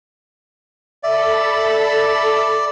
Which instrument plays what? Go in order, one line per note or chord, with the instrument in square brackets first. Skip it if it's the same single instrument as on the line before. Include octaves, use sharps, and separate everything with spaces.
[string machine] A4 B5 [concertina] D5 [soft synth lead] E5